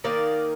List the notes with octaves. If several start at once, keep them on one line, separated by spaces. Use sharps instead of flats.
D#3 A#3 D#4 D5